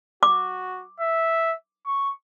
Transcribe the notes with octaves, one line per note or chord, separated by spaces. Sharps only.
F#4 D6
E5
C#6